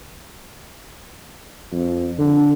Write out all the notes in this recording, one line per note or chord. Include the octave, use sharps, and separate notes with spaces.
F2
D3